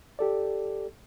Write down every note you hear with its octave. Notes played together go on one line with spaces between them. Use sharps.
G4 A4 D5